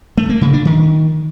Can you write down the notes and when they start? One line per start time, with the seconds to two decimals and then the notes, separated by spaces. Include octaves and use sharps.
0.18 A3
0.29 A#3
0.41 C#3
0.53 D4
0.65 D#3